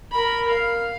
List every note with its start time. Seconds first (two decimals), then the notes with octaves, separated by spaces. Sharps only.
0.12 A#4 B5
0.48 F5